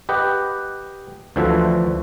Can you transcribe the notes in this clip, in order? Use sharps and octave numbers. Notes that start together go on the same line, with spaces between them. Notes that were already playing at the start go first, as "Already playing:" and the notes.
G4 B4 D#5 F#5
D2 D3 E3 F3 F#4 E5